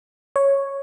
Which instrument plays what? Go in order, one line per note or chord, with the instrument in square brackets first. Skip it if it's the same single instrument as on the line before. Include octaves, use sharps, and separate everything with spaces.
[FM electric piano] C#5